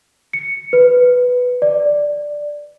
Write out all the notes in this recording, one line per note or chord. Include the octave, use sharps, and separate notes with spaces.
C#7
B4
D5